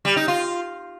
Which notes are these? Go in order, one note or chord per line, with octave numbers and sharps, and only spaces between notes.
G3
D#4
F4